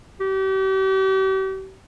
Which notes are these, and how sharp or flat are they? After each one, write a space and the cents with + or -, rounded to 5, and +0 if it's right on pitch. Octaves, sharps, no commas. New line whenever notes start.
G4 -40